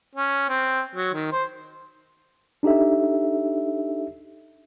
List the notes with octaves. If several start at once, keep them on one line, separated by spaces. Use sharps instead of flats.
C#4
C4
F#3
D#3
C5
D4 D#4 G4 A4 E5